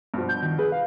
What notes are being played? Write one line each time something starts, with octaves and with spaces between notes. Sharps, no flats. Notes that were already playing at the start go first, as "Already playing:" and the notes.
G2 B2 F3
G6
D#3
G#4 B4
F5